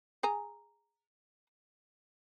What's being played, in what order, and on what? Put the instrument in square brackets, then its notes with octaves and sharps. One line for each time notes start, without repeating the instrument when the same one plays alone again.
[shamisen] G#4 G#5 A#5